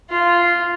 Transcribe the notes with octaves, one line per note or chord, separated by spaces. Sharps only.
F4